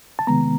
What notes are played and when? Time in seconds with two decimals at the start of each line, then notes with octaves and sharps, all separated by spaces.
0.19 A5
0.27 C3 D#3 G#3 B3 A#5